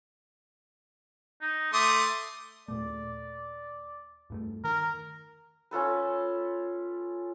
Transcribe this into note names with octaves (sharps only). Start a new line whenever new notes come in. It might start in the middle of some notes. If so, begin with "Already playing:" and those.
D#4
A3 C6 D6 D#6
D#2 A#2 A3 D5
E2 G2 A3
D#3 A#4
C#4 F4 A4 B4